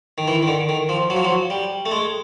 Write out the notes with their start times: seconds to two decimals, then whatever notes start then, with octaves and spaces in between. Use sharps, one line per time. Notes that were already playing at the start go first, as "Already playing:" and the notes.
0.18 D#3
0.28 E3
0.43 D#3
0.47 D3
0.69 D#3
0.89 F3
1.10 F#3
1.16 F3
1.25 F#3
1.50 G3
1.86 A3
1.91 G#3